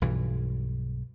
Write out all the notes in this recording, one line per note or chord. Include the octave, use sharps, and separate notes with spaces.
B1 G2 E3